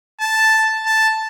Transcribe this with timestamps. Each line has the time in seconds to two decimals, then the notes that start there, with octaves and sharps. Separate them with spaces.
0.21 A5
0.86 A5